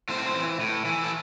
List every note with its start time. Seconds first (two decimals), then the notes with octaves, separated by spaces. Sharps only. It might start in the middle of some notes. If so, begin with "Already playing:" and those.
0.09 A2 C4 C5
0.35 E3
0.60 A2
0.85 E3
1.04 A4